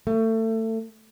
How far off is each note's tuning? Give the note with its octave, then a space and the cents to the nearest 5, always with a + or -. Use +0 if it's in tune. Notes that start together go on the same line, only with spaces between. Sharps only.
A3 +25